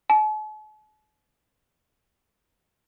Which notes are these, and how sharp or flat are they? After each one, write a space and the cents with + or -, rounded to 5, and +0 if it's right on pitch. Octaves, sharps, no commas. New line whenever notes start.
A5 -45